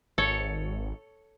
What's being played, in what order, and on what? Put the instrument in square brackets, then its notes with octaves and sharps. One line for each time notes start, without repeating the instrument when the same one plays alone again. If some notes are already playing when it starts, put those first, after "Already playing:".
[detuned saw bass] G#1 [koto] A4 C#5